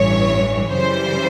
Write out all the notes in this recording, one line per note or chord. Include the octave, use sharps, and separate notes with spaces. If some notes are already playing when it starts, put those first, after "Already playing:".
Already playing: A1 G2 E3 C#5
F#2 C#3 E3 G3 C5